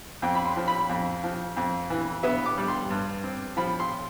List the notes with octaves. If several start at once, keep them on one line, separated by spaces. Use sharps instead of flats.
F2 G5
B5
C6
F3
B5
F2
F3
F2
E3
B3 E5
D6
G3
C6
G2
C4
F3 B5
C6